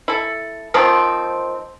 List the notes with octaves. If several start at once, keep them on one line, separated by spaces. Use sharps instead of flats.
E4 A4
D#3 F3 C4